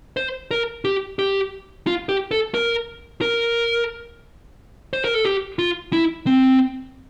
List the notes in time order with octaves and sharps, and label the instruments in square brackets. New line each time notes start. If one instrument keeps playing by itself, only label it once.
[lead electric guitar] C5
A#4
G4
G4
F4
G4
A4
A#4
A#4
C5
A#4
A4
G4
F4
E4
C4